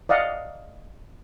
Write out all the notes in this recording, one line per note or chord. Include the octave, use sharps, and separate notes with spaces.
D5 D#5 F5 F#5